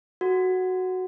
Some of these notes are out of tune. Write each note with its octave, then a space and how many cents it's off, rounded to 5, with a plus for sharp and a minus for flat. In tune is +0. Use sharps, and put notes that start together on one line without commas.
F#4 +0 A4 -10